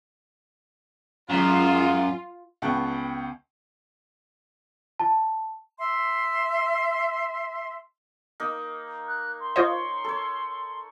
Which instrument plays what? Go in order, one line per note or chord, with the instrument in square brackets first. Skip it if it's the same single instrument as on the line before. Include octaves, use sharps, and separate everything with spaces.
[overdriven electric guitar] F#2 [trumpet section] G#3 F5 [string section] F4
[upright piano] C#2 B3 F#5 G5 A5 C#6
[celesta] A5
[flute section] E5 C6
[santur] A#3 D#4
[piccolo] F#6
C6
[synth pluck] F4 C5 D#5 [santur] C#5
[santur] A4 C#5